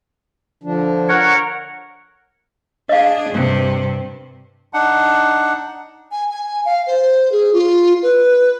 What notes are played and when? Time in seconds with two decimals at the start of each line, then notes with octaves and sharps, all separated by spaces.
0.63 D3 F3 D4
1.09 A#4 C#5 F#5
2.89 D4 G#4 D#5 F5
3.30 G2 C3
4.74 D4 D#4 F#5
6.12 G#5
6.31 G#5
6.65 F5
6.87 C5
7.32 G#4
7.53 F4
8.03 B4